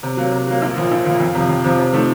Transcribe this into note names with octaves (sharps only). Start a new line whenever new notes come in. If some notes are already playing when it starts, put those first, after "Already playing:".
C3
F#3 A#3
C3
F#3 A#3
A#1
A#2 F3 A#3
A#1
A#2 F3 A#3
F2
C3 F3
F2
C3 F3
C3
F3 A3 C4 D#4